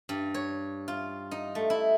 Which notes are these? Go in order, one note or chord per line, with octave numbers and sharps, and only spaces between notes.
G2
C#5
F4
D#4
A3
E4